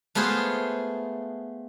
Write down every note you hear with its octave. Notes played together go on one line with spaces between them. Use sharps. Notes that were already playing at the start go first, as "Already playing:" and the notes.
A3 B3 F4 G#4 C5